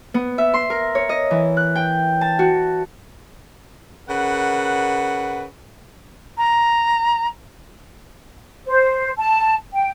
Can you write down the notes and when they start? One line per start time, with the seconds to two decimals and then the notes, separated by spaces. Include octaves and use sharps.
0.14 B3
0.38 E5
0.54 C6
0.70 A#4
0.95 C#5
1.09 D#5
1.31 E3
1.57 F#6
1.75 G5
2.21 A5
2.39 F#4
4.09 C#3 A#4 B4 F#5
6.37 A#5
8.66 C5
9.17 A5
9.73 G5